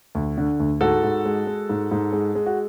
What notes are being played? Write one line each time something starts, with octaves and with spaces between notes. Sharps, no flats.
D2
D3
D2
G#2 F#4 A4
G#2
G#3
G#3
G#2
G#2
G#3
G#3
F#4